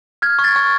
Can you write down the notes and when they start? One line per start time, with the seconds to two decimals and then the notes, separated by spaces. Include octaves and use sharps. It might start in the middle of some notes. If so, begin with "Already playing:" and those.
0.22 F6 G#6
0.39 C#6
0.44 A6
0.56 C#6